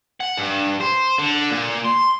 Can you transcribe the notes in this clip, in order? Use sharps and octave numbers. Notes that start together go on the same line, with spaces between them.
F#5
G2
C5
D3
A#2
C6